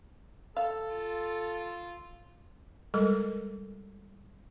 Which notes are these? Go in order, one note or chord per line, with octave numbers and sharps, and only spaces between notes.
A4 F5
F4
G3 G#3 A4 A#4